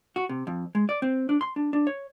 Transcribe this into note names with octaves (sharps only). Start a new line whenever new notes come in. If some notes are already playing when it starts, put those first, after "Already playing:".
F#4
C3
F2
G#3
D5
C4
D4
C6
D4
D4
C#5